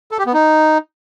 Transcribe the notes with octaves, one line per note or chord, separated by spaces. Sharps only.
A4
G4
B3
D#4